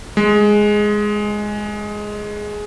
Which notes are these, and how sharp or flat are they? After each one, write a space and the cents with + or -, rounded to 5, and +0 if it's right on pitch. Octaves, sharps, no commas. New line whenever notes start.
G#3 +5